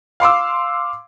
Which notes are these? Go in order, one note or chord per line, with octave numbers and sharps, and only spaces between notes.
F5 C6 D6 E6